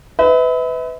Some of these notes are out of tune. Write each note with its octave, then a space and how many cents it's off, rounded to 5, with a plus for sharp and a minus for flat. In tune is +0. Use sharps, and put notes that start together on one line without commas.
B4 +25 E5 -40